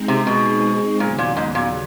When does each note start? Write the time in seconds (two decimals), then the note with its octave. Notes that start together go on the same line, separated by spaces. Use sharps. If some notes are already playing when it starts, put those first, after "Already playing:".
Already playing: G#3 C4 D#4 G#4
0.08 C3
0.27 B2
1.00 D#2 A#2 C#3 F#3 B3
1.18 A#2
1.37 G#2
1.55 A#2